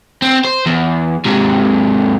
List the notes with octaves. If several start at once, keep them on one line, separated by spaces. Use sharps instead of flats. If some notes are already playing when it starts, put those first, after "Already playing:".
C4
C5
E2
G#2 C3